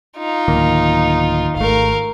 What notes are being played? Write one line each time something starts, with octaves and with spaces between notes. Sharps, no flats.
D#4 F4
D1 D#3 A#3
G#1 A3 A#4 F5